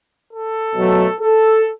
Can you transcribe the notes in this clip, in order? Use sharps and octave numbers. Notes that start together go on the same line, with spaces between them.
A4
B2 F#3 A3
A4